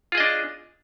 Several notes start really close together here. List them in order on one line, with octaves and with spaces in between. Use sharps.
F4 G#4 D#5 D4